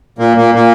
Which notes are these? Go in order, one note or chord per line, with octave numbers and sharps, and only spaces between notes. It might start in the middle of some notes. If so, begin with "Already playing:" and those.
A#2 A#3
A#2 A#3
A#2 A#3